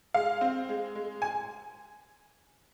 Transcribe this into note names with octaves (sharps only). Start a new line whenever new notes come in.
G#3 F5
C4
G#3
G#3
G#5